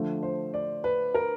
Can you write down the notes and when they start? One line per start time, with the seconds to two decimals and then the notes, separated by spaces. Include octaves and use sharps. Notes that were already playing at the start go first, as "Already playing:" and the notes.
Already playing: D3 F3 A3
0.23 C5
0.54 D5
0.84 B4
1.14 A#4